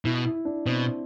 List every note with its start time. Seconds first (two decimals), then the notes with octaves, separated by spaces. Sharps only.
0.05 B2 E4
0.25 E4
0.45 D4
0.66 B2 C4